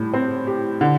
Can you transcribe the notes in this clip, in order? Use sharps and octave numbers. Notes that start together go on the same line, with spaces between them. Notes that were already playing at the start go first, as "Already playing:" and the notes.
Already playing: A2 G3
C4
G4
D3